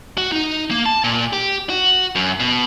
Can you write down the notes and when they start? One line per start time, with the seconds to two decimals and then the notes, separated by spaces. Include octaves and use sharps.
0.18 F#4
0.32 D#4
0.71 A#3
0.86 A5
1.04 A#2
1.33 G4
1.70 F#4
2.15 F#2
2.40 B2